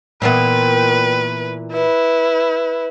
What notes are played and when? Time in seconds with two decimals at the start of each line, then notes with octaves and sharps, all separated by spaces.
0.22 A#2 E3 B3 B4 G5
1.72 E4 B4